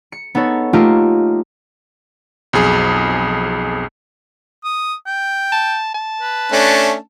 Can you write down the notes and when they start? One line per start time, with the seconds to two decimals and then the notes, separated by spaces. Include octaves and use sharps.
0.12 C#7
0.35 B3 D#4 A4 C#5
0.73 A3 A#3 D#4 F4 G4 A#4
2.53 B1 F2 G#4
4.64 D#6
5.06 G5
5.52 A5
5.94 A5
6.22 B4
6.52 A3 C#4 D4